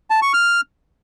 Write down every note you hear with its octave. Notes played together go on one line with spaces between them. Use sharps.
A5
C#6
F6